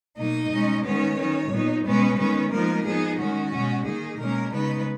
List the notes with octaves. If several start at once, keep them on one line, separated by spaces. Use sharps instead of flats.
B2 F#3 A#3 D#4 D#5
B2 G#3 C#4
D#3 G#3 B3 C#4 C#5
D#3 F#3 C#4
A#2 F#3 B3 D#4
B2 G#3 B3 C#4 B4
D#3 G#3 B3 C#4 B4
F3 G#3 A#3 B3 D#4 A#4
F3 B3 D#4 G#4
D#3 G#3 C#4 F#4
B2 G#3 C#4
D#3 A#3 D#4 G#4
B2 G#3 A#3 C#4 A#4
C#3 G#3 B3 D#4 B4